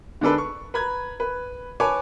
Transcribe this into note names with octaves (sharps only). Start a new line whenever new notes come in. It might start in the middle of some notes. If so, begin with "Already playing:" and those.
D3 G#3 D4 A4 B4
C#6
B4 A#5 B5 G#6
B4
B4 C#5 G#5 A5 D6